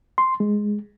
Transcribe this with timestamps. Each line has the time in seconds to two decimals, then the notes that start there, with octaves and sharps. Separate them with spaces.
0.18 C6
0.40 G#3